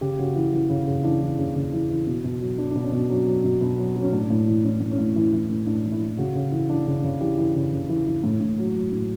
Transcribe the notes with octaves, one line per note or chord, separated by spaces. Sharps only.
C#3 G4
C#3 F#4
E3
E3
C#3
C#3
E3 D4
E3
C#3
C#3
E3
E3
B2
B2
F#3
F#3 D4
B2 D4
C#4
B2
F#3
F#3
B2
B2
F#3
F#3
C#4
A2 D4
A2
E3
E3 C#4
A2
C#4
A2
E3
E3
A2
A2 D4
E3
E4
E3
C#3 F#4
C#3
E3
E3 D4
C#3
C#3
E3 G4
E3
C#3
C#3
E3
E3
A2
A2
F#3
F#3
A2